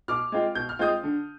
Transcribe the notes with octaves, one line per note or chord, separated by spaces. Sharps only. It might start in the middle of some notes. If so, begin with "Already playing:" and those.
B2 D6 F6
G#3 C4 F4
B2 G6
F6
G#3 C4 F4 D#6 G6
D3